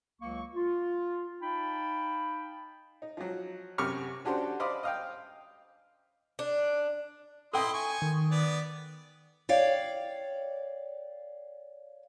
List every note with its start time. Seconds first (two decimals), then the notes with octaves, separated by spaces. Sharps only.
0.21 C#2 F#3 A#3 C#6
0.55 F4
1.42 D#4 F5 G5 A5 B5
3.02 D#4
3.17 F3 F#3
3.78 F#2 C3 G4 C#6 D6 F6
4.25 C#4 D4 F#4 G4 A4 C5
4.60 C5 D5 D#5 F5 B5
4.83 D#5 F5 G5
6.39 D4
7.54 E4 A4 D#5 G5 C6 D#6
7.74 G#5 C#6
8.02 D#3
8.31 B3 D5
9.49 C#5 D5 F5 G5